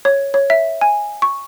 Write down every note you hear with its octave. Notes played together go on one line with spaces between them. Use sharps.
C#5
C#5
E5
G#5
C#6